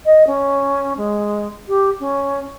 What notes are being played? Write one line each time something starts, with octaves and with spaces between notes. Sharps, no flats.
D#5
C#4
G#3
G4
C#4